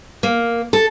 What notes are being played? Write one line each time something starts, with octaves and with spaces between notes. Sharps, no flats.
A#3
A4